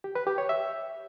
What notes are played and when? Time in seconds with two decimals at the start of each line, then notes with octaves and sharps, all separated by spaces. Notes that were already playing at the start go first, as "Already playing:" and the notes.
0.04 G4
0.15 B4
0.27 G4
0.38 C#5
0.49 E5